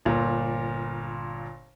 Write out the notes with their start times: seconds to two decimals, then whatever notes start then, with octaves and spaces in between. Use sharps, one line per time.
0.05 G1 A#2